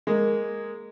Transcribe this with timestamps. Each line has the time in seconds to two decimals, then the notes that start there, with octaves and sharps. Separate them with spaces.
0.07 G#3 A#3